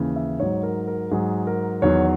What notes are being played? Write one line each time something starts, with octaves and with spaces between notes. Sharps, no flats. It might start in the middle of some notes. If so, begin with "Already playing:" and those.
Already playing: D#2 C#3 E3
E5
G#2 F#3 C#5
A#4
A#4
G#2 F#3 G#4
A#4
E2 D#3 F#3 C#5